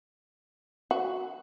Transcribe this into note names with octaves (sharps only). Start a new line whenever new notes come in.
F#4